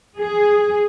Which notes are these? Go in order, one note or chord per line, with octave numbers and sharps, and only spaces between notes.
G#4